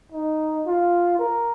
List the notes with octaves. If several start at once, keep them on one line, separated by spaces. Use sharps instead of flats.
D#4
F4
A#4